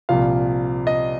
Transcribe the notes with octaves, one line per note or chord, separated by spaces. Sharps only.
C2 A#2 F3 F5
D#5